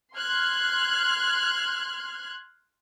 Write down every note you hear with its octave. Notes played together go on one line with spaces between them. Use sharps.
C6 F6 F#6 G#6